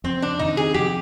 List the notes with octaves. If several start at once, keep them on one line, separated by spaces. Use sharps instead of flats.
F2 C4
D4
C3 D#3 D#4
G#4
F2 G4